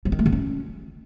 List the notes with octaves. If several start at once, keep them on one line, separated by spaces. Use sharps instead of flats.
F3
D#3
A3
D3
C#4